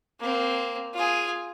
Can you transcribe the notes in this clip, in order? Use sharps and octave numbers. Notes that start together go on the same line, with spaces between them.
A#3 C4
F4 G#4